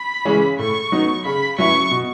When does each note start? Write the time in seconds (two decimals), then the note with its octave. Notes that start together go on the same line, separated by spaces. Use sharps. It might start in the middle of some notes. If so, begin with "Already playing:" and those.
Already playing: B5
0.25 C#3 E3 G#3 C#4
0.59 A2 C#6
0.92 F#3 B3 D#4
1.25 C#3 B5
1.58 F#3 C#4 E4 B4 C#6
1.91 B2